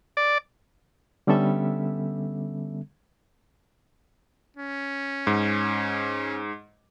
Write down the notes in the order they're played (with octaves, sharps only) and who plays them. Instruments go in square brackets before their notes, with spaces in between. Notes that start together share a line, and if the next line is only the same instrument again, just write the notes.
[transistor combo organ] D5
[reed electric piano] D3 G3 B3 C#4 A4 E5
[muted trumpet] C#4
[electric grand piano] G#2